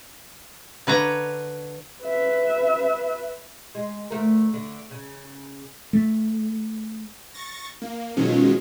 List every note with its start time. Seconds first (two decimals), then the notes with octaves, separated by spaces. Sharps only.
0.87 D3 B4 C#5 A#5
2.04 B4 E5
3.75 G#3
4.10 D2 A3 A#4
4.53 D3
4.91 C#3
5.93 A3
7.34 C#6 A6 A#6
7.82 A#3
8.17 B2 D#3 F3 F#3 G#3 C#4